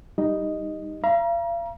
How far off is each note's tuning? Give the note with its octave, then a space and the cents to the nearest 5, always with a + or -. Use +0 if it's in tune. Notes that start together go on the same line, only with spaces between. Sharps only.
G3 +0 D#4 +0 D#5 +0
F5 -40 A#5 +30